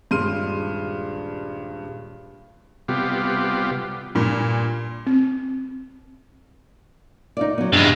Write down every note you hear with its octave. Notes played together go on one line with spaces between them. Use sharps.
D#1 G2 G#3 C6 F6 D#7
C3 G3 B3 F4 G4
G2 A#2
C4
D#4 F4 D5
F#3 B3
E2 G2 C#3 G#3